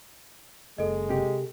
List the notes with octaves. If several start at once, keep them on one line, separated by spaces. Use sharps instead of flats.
F#1 G#3 A4 D#5
C3 G4